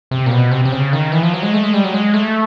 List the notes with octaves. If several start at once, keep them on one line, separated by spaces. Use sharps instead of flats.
C3
A#2
B2
C3
C3
C#3
D#3
E3
F3
F#3
G#3
A3
G#3
G3
F#3
G#3
A3